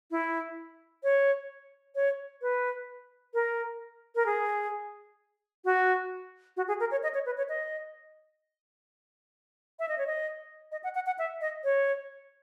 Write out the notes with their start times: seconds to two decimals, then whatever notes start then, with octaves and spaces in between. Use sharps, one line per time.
0.11 E4
1.03 C#5
1.95 C#5
2.42 B4
3.34 A#4
4.15 A#4
4.26 G#4
5.65 F#4
6.57 F#4
6.68 G#4
6.80 A#4
6.91 C#5
7.03 D#5
7.14 C#5
7.26 B4
7.37 C#5
7.49 D#5
9.79 E5
9.89 D#5
9.98 C#5
10.07 D#5
10.72 D#5
10.84 F#5
10.95 F#5
11.06 F#5
11.19 E5
11.41 D#5
11.64 C#5